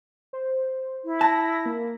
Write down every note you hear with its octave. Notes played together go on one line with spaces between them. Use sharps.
C5
E4
A5 A#6
A#3